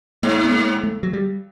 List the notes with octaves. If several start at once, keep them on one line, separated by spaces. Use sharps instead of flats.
G#2 A#3
B3
A#3
A3
F#3
G3